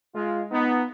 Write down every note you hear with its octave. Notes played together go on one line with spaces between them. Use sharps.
G#3 F4
B3 D#4